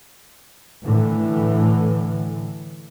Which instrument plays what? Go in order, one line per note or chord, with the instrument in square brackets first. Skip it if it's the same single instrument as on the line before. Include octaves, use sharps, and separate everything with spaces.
[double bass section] A2 D3 E3